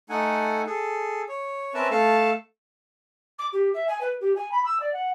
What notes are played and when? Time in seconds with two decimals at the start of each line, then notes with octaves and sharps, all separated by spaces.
0.10 A3 D#4 A4 F#5 G#5
0.66 G#4 A4
1.29 C#5
1.74 C4 C#4 A#4 B4 E5 A5
1.91 A3 A4 F5 A5
3.38 D6
3.52 G4
3.74 E5
3.87 G#5
4.00 B4
4.20 G4
4.35 G#5
4.51 B5
4.65 E6
4.79 D5
4.92 F#5